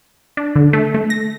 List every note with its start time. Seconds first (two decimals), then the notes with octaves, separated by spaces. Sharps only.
0.37 D4
0.56 D3
0.73 A3
0.94 A3
1.10 A#6